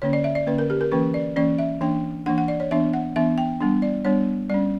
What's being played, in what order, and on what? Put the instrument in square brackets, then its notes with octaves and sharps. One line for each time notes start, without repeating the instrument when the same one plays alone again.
[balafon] D3 A#3 C#4 C#5
D5
E5
D5
D3 A#3 C#4 B4
A#4
G4
A#4
E3 A#3 C#4 B4
D5
E3 A#3 C#4 D5
E5
E3 A#3 D4 G5
E3 A#3 D4 F#5
F#5
D5
C#5
E3 B3 D4 E5
F#5
E3 B3 D4 E5
G5
G3 B3 D4
D5
G3 B3 D4 C#5
G3 C#4 D5